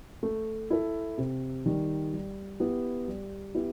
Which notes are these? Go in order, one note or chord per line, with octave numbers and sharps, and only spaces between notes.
A3
E4 A4
C3
D#3 G3
G3
B3 E4 G4
G3
B3 E4 G4